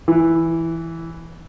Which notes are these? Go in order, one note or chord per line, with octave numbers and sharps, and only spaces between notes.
E3